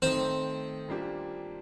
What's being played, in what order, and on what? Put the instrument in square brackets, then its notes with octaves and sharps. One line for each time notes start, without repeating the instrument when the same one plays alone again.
[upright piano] D#3 A3 D#4 [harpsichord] C4 C5
[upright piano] A#2 G3 A#3 D4 G4